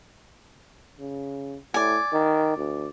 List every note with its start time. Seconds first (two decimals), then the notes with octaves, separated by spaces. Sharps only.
1.00 C#3
1.74 A2 D5 G#5
2.13 D#3
2.57 D2